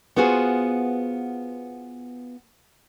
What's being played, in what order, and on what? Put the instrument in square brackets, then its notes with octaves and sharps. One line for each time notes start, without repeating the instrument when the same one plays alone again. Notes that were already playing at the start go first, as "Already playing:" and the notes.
[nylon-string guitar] B3 F4 F#4 G#4 C5